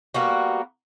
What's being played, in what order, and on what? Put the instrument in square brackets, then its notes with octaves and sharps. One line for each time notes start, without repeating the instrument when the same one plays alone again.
[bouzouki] G3 A#3 B3 F#4